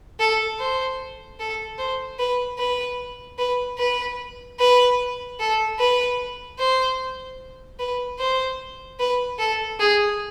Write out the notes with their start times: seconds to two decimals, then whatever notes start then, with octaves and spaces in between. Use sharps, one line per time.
0.19 A4
0.59 C5
1.39 A4
1.78 C5
2.19 B4
2.58 B4
3.38 B4
3.78 B4
4.59 B4
5.39 A4
5.79 B4
6.59 C5
7.79 B4
8.19 C5
8.99 B4
9.38 A4
9.79 G#4